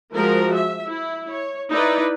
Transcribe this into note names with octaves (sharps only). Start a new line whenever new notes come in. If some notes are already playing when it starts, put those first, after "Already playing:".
F3 G#3 F#4 A#4
E5
E4
C#5
D#4 E4 B4 D5